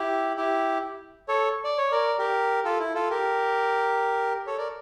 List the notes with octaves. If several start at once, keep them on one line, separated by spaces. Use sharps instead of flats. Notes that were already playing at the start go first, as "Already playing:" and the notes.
Already playing: E4 G4
E4 G4
A4 C#5
D5
C#5
A#4 D5
G4 A#4
F4 A4
E4
F4 A4
G4 A#4
A4 C#5
A#4 D5